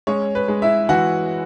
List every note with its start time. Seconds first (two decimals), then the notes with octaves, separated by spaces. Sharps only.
0.07 G#3 C#4 C#5
0.35 B4
0.48 G#3
0.62 E4 E5
0.89 E3 F#4 F#5